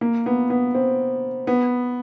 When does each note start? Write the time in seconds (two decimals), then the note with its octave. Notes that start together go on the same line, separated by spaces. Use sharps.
0.01 A#3
0.26 B3
0.50 B3
0.75 C4
1.47 B3